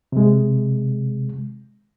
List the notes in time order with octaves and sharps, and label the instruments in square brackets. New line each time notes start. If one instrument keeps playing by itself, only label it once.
[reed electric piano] C3 G#3